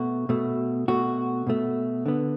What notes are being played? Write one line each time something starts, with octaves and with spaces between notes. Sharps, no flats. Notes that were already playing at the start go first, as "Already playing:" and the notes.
Already playing: B2 A3 F#4
B2 A3
B2 A3 F#4
B2 A3
D3 B3